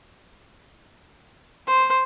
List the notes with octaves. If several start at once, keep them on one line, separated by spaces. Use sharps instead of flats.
C5